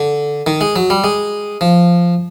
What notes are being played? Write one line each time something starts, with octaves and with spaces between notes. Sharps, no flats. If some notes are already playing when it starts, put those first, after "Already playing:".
Already playing: D3
D#3
G#3
F#3
G3
G#3
F3